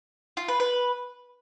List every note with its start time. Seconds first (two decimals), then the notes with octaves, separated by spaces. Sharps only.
0.37 F4
0.48 B4
0.60 B4